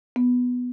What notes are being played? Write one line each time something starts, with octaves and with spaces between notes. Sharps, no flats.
B3